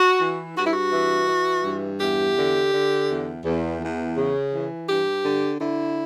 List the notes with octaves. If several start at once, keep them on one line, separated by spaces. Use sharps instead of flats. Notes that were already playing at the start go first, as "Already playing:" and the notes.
Already playing: F#4
E3
G2 F#4
E4
F#4
E3
E3
G2
E2 G4
D3
D3
E2
E2
E2
C#3
E3
G2 G4
D3
D3 E4